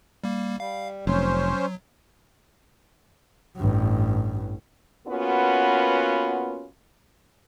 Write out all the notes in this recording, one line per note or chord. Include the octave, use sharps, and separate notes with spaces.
G3 A#3
G3 F5
F1 F#3 C#4 C5
A1 G2
A#3 B3 C#4 F4 F#4 B4